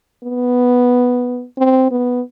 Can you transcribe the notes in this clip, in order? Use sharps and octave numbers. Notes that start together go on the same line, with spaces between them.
B3
C4
B3